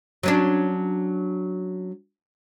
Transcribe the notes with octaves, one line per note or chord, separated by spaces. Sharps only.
F#3 C#4 D4